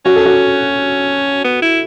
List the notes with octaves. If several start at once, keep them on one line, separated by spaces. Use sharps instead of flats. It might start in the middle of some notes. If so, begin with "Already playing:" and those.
C#4 F#4
A4
F#4
B3
E4